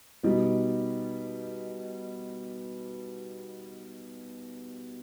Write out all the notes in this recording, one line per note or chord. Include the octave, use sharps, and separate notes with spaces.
B2 G3 B3 D#4